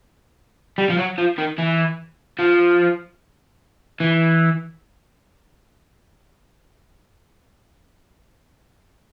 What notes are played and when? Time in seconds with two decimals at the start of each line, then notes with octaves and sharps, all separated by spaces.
0.78 G3
0.90 F3
0.98 F#3
1.18 F3
1.38 D#3
1.59 E3
2.39 F3
4.00 E3